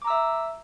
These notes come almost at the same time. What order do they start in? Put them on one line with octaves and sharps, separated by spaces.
D6 A#5 E6 E5